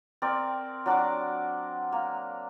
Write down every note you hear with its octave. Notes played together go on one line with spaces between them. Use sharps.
C4 A#4 D5
F#3 D4 F#5 D6
A#3